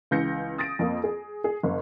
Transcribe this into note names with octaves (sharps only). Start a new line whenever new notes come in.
C#2 E3 G6 A#6 C#7
D#6 A6 A#6 D7
F2 A#3
G#4
G#4
F#1